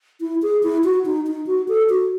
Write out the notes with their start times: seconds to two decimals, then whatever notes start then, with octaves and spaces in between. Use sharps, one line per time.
0.21 E4
0.42 G#4
0.63 E4
0.84 F#4
1.06 D#4
1.27 D#4
1.47 F#4
1.69 A4
1.89 F#4